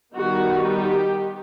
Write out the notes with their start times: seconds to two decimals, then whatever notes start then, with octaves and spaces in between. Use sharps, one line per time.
0.15 D#3 G3 B3 D#4 F#4
0.71 G4